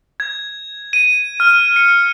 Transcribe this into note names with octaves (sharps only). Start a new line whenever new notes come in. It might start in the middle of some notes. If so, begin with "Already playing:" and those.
G#6
D#7
F6
C#7